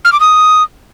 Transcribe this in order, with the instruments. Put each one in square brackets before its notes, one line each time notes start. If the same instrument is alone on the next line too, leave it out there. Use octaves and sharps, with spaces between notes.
[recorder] F6
D6
D#6